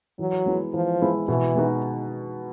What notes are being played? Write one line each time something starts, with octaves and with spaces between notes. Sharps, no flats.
E3 F#3
G#3 B3 E4 G#4
E3 F3
G#3 B3 E4 G#4
B2 E3
G#3 B3 D#4 F#4